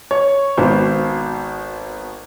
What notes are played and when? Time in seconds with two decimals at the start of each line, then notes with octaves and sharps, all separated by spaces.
0.11 C#5
0.57 G#1 B2 C5